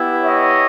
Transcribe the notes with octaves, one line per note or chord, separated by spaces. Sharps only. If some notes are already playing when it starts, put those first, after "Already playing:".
Already playing: B3 E4 G4
C#5 D#5